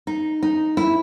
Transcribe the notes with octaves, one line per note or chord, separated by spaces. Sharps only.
D#4
D#4
E4